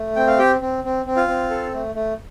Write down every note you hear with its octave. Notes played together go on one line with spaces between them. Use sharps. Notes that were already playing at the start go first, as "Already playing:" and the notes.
Already playing: A3
C4 G5
F5
G4 G5
C4
C4
C4
F4 F5
C4
A4
A3
A3